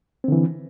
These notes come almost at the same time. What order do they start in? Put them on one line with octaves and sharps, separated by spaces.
C4 D3 E3